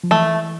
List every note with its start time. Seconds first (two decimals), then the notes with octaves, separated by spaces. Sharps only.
0.04 F3
0.11 E3 A3